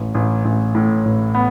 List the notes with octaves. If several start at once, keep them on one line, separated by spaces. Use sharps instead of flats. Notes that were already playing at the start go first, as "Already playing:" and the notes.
Already playing: A1
A1
A1
A2
A1
B3